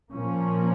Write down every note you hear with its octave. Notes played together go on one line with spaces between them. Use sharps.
A#2 F3 A#3 C#4